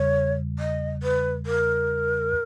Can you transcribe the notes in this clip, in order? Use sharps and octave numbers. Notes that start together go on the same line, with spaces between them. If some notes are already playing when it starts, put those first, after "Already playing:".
Already playing: E2 C#3 G3 C#5
D#5
B4
A#4